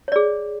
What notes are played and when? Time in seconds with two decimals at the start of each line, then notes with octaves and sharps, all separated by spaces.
0.08 C#5
0.12 D5
0.16 G#4